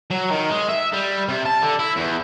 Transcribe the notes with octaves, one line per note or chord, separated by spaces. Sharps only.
F#3
D#3
G#3
E5
G3
C3
A5
D3
E4
E2